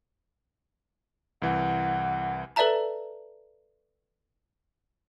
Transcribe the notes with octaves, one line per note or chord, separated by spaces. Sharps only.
C2 E3 F#5
A4 B4 D5 E5 A5 A#5